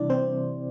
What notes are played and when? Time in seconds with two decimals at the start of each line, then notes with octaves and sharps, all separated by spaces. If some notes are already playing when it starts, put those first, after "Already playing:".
Already playing: C3 E3 G3 D4 E4 D5
0.10 C4 C5